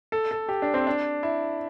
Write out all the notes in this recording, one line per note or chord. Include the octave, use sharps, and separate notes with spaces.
A4
A4
G4
D4
C4
D4
E4